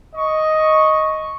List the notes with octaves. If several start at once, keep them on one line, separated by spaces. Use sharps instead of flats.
D#5 C#6